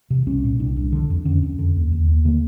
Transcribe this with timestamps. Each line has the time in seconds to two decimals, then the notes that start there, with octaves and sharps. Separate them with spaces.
0.10 C3
0.26 C2 C#4
0.44 A#2
0.59 C2 D4
0.76 C2
0.92 D3
1.10 F2
1.25 D3 C#4
1.43 F2
1.59 D3
1.76 D#2
1.92 D#2
2.08 D#2
2.25 D3 A#3